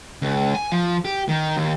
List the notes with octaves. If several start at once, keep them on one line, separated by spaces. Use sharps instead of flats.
C#2
G#5
F3
G4
D#3
D#2